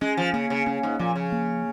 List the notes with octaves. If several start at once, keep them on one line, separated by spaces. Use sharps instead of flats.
G#3 C#4
F3
C#3 A#3
C#3
C#3 C#4
G#2
A#2 F3
C#3
A#3